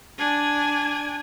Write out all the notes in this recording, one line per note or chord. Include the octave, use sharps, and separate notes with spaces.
D4 G#5